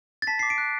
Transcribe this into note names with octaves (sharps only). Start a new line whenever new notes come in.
A6
A5 B6
C7
D6
D7
F#6